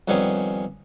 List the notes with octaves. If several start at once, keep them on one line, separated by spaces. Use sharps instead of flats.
F2 D#3 G3 B3 C#4 G#4